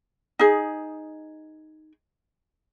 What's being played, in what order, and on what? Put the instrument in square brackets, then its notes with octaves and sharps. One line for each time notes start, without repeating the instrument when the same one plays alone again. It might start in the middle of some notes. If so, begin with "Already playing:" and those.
[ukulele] D#4 G#4